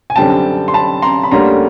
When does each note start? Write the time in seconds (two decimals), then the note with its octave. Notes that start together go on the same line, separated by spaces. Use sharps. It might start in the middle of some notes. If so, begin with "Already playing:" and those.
0.10 G#5
0.16 F#2 D3 G3 C4 G5 A5
0.68 C6
0.74 A5 B5
1.02 A#5 C6
1.23 B5
1.31 D2 D3 G3 A#3 C#4 A#5 C6